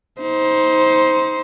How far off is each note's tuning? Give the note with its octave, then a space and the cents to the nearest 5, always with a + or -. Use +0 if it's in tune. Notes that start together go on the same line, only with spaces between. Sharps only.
D#4 +35 C5 +0